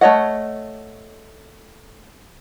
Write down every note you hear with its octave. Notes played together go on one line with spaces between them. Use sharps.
A3 D4 C#5 D#5 F#5